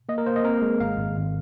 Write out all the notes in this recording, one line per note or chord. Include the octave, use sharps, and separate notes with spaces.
A#3 D#5
A#4
A#3 C5
D#5
C4 A#4
G#3
G#1 F5
G#1
G#1